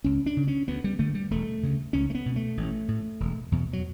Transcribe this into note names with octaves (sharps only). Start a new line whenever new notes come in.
C#2 C#4
D4
C#3
C#4
D2 B3
G3
D3 A3
G3
E1 A3
D2 C#3
C#2 C#4
A3
B3
B2
A3
A1
A2
E1
E2 B2
F#3